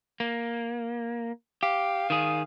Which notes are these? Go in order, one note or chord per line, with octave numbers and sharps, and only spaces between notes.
A#3
G4 F5
D#3 G#4